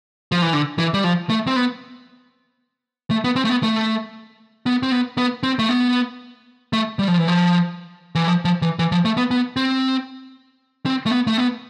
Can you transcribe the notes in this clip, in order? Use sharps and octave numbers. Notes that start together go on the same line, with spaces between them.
F3
E3
D3
E3
G3
F3
A3
C4
B3
A3
B3
C4
A3
B3
A3
B3
C4
B3
B3
C4
A3
B3
A3
G3
F3
E3
F3
E3
F3
F3
E3
E3
F3
A3
B3
B3
C4
C4
A3
B3
A3
B3